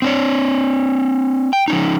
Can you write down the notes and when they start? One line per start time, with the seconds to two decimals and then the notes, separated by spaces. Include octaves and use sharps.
0.02 C4 D4 C#5
1.53 G5
1.68 F3 C#4 D#4